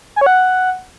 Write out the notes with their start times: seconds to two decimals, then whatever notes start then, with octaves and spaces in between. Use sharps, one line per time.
0.16 G#5
0.21 C#5
0.26 F#5